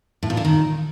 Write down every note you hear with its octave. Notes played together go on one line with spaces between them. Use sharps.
A2
A#2
D3
D#3